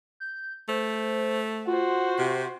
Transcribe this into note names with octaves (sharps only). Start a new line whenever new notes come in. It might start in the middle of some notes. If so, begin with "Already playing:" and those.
G6
A3 C5
F4 F#4 C5
C3